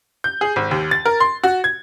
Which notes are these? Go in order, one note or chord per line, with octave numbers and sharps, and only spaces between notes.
G6
G#4
G#1
D#2
A6
A#4
C6
F#4
G#6